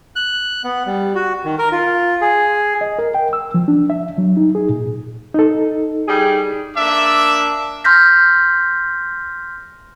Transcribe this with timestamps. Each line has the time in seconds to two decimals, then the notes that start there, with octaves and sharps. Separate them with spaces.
0.16 F#6
0.64 B3
0.86 G3
1.15 F#4
1.45 D#3
1.59 A#4
1.72 F4
2.21 G#4
2.81 D#5
2.99 A#4
3.14 G5
3.33 E6
3.54 F3
3.68 D4
3.90 E5
4.18 F#3
4.37 D#4
4.55 G#4
4.69 A#2
5.34 D#4 A4
6.08 G3 G#4
6.77 A#3 D4 E5 A5 D6
7.84 C6 F6 G6 A#6 B6